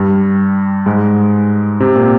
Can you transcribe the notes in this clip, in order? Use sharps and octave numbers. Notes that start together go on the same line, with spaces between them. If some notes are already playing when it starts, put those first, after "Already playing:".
Already playing: G2 G3
G#2 G#3
C3 C4
A#2 A#3